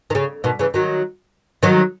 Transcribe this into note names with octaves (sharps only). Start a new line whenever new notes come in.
D#3
C#3
B2 D#3
C#3 E3
D#3 F#3
D#3 F#3